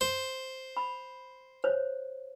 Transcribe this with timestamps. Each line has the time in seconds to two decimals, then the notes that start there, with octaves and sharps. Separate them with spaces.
0.01 C5
0.77 B5
1.64 C5 C#5